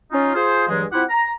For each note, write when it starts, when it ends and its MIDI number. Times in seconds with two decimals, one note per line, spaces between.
0.12 0.32 61
0.12 0.32 63
0.12 0.32 65
0.34 0.66 65
0.34 0.66 68
0.34 0.66 72
0.68 0.84 43
0.68 0.84 52
0.68 0.84 54
0.68 0.84 56
0.92 1.03 60
0.92 1.03 64
0.92 1.03 65
0.92 1.03 67
0.92 1.03 78
1.09 1.32 82